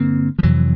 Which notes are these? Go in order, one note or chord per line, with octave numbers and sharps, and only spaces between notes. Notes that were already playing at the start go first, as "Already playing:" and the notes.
Already playing: G2 D3 A#3 C4
F3
F2 C3 E3 F#3